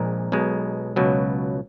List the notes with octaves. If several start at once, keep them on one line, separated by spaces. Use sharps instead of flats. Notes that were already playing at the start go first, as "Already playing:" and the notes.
Already playing: A#1 A#2 G#3 A#4
B1 B2 G#3
C#2 B2 F#3